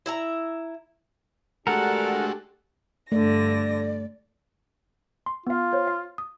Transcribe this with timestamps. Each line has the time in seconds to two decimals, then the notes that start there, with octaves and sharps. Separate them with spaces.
0.06 E4 E5 A#5
1.67 G#3 A3 D4 F#4 G4 A4 A#4 F#5
3.12 G2 D3 A3 D5 A#6
5.26 C6
5.47 B3 F4 F5
5.73 C5 C#5
5.88 F5
6.18 D#6